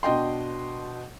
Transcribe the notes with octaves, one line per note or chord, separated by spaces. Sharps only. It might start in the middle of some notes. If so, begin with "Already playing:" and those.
B2 D4 D#5 G5 C6